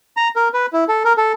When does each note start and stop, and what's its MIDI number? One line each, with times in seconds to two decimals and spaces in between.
0.17 0.28 82
0.36 0.48 70
0.54 0.66 71
0.73 0.84 64
0.88 1.03 69
1.05 1.13 70
1.17 1.32 69